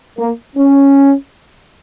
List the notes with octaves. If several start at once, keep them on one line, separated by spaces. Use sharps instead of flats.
A#3
C#4